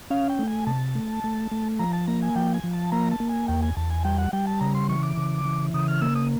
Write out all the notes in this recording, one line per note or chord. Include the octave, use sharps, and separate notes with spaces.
C#4 F5
G5
A3
G#5
C3 A5
A3
A3
A3
F3 A#5
A5
A#3 A#5
G#5
F3 G5
G#5
F3
A5
A#3 A#5
A5
A#3
G#5
E2 G5
G#5
E2 A5
G#5
G3 G5
F#5
G3 G5
A5
C#3 A#5
C6
E3 C#6
D6
C#3
E3
C#3 D#6
F6
A#3 E6
D#6